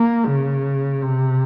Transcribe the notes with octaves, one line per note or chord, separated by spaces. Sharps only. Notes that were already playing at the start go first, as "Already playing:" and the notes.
Already playing: A#3
C#3
C3